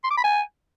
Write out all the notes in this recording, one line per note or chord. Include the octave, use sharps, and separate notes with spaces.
C6
D6
B5
G#5